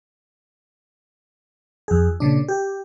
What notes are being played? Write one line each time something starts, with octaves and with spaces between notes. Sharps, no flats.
F2 G#4
A#2 C#3 D4
G4